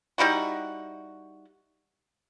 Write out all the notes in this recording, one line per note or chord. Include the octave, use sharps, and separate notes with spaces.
G3 D#4 E4 F#4